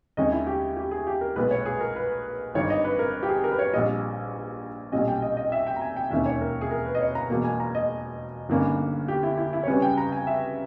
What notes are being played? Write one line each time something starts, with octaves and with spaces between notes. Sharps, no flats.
D#2 D#3 G#3 C#4 D#5
E4
G4
G4
G#4
G4
A#4
B1 A#2 G#3 B3 B4
C#5
G#4
A#4
B4
G#1 G2 D#3 C#5
D#5
B4
A#4
G4
G#4
A#4
B4
C#5
A#1 A#2 G3 D#5
B1 A#2 G3 C#4 D#5
G5
D#5
D#5
E5
G5
A#5
G#5
G5
E1 D#2 D#3 A#3 C#4 E5
C#5
A#4
G#4
A#4
B4
D#5
C#5
A#5
E1 E2 B2 A#3
G#5
A#5
D#5
G1 G2 D#3 A#3 C#4
G4
E4
E4
E4
C#5
C#2 C#3 G3 C#4 B4
G5
A#5
G#5
E5